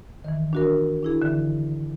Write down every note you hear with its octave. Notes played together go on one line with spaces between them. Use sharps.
D#3 E3
D4 F#4 A#4
D4 E4 G#4
D3 E3